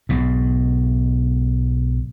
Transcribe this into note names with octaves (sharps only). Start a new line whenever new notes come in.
B1 G#2